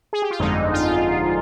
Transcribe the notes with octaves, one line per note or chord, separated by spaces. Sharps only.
G#4
G4
F4
G1 F2 D3 G#3 D#4
F4